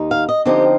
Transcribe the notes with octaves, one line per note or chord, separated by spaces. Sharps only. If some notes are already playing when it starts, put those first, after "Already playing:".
Already playing: D#2 D#4
F5
D#5
D3 F3 C4 D#4 G4